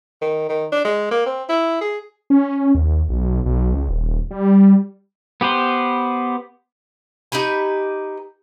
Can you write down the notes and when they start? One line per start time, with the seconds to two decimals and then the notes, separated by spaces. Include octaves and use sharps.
0.22 D#3
0.49 D#3
0.72 D4
0.85 G#3
1.11 A#3
1.26 C4
1.49 E4
1.81 G#4
2.30 C#4
2.75 D#2
3.09 B1
3.46 B1
3.74 C#2
3.89 D#1
4.31 G3
5.41 B3 G4 B4 C5
7.32 D#4 G4 B4 G#5